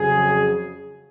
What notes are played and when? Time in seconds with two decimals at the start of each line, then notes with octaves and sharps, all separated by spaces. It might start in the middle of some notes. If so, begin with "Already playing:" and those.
Already playing: F2 C#3 F#3 G#4